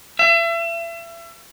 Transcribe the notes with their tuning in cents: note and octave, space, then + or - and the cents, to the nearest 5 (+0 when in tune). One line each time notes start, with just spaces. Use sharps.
E5 +35